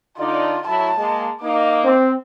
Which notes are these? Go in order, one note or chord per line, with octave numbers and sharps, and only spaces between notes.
D3 D#4 F4 D5
A2 F#3 E4 A5
G#3 A#3
A#3 D#4 D6
C4